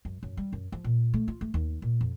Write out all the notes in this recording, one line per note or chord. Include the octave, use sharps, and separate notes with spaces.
F#2
F#2
G3
F#2
F3
A#2
A3
F4
A3
D#2
A#2
F2